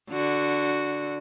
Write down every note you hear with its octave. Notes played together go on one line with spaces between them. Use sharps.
D3 F#4